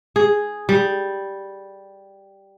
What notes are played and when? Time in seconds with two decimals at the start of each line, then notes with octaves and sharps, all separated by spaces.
0.16 G#4
0.69 G3